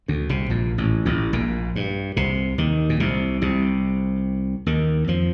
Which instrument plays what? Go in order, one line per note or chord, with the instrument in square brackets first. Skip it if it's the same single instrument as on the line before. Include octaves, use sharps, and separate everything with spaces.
[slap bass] D2 D3
C2 C3
A#1 A#2
A1 A2
A1 A2
A#1 A#2
G2
C2 C3
D#2 D#3
A#2
C2 C3
C2 C3
D#2 D#3
F2 F3